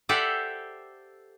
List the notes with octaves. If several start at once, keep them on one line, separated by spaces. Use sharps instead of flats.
G4 A4 C5 D5 E5 F#5